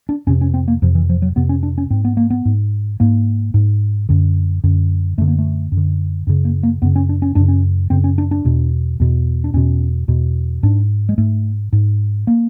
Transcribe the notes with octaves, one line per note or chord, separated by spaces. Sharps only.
D4
F2 C3 C#4
C#4
C4
A#3
F2 C3 F3
E3
F3
F#3
F2 C3 B3
C#4
D4
C#4
G#2 C4
B3
A#3
B3
G#2
G#2 A#3
G#2
F#2 D3
F#2 D3
F#2 D3 A3
A#3
A3
F#2
D3
F#2 C#3
A#3
A#3
F#2 C#3 B3
C#4
D4
C#4
F#2 C#3 D4
C#4
F#2 C#3 C4
C#4
D4
D4
E2 B2
E2 B2
D4
E2 B2 C#4
E2 B2
G#2 D4
G#3
G#2 A3
G#2
A#3